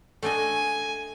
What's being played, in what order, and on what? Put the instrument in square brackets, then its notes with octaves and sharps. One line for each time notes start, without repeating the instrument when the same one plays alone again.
[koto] A3 D4 D#5 [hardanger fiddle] G#5